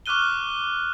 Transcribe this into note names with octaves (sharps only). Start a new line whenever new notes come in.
C#6 D6 F6 F#6 D#7 G7